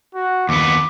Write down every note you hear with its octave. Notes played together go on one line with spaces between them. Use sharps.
F#4
D#2 B3 D6